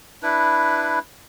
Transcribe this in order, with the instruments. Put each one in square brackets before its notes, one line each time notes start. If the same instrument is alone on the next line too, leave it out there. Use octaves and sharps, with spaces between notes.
[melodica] D4 E4 B4